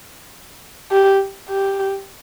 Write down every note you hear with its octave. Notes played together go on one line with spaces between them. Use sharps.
G4
G4